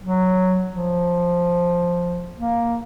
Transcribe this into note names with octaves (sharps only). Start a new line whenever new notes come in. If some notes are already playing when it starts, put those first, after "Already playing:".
F#3
F3
A#3